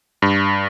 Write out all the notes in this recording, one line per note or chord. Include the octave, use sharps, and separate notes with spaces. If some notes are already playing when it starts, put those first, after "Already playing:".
G2